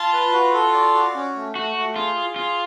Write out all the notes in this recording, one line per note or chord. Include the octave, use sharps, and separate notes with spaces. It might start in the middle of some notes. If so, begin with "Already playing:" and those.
Already playing: F4 A5
B4
F#4
A4
D5
F#4
C#4
A3
A3 F#4
A3
F4 G#4
G#4
F4 G#4